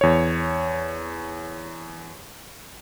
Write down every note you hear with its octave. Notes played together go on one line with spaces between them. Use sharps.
E2 C#5